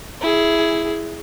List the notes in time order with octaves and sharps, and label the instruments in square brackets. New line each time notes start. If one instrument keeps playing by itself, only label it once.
[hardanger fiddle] E4 G#4